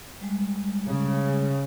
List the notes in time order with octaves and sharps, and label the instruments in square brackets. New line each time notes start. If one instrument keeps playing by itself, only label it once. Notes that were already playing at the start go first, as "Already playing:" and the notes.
[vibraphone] G3 G#3
[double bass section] C#3